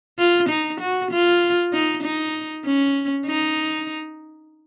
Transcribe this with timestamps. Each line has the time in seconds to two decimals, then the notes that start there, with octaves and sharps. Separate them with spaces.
0.19 F4
0.49 D#4
0.81 F#4
1.11 F4
1.73 D#4
2.03 D#4
2.66 C#4
3.26 D#4